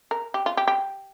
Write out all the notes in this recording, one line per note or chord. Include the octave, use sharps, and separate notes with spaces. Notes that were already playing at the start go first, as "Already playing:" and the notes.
A#4
G4
F4
G4
G4